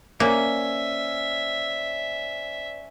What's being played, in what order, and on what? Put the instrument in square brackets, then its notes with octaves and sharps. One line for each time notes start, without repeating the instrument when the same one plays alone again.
[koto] A#3 [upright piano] C#4 G#5 [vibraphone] C5 D5 [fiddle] E5